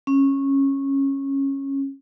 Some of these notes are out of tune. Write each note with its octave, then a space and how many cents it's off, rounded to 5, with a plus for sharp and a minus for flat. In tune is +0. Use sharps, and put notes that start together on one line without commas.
C#4 -15